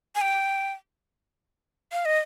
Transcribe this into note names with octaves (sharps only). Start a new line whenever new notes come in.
G#5
G5
F5
D#5